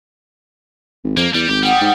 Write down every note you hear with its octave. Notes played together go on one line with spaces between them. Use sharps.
G#1
F2 A#3
E2 G3
G#1 G4
G3 F#5 G5 D#6
G#2